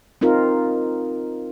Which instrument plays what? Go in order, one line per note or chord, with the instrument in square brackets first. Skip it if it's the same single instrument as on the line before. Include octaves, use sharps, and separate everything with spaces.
[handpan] C4 D#4 F4 A#4